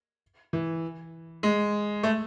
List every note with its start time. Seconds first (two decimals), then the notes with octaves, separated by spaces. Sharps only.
0.53 E3
1.43 G#3
2.03 A3